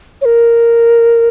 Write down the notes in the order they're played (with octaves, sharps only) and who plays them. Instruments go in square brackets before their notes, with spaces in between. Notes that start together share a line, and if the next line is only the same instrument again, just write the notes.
[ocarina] C#5
A#4